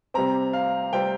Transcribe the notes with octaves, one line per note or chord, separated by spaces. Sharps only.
C3 G3 C4 A#5
F5
C3 G3 C4 G5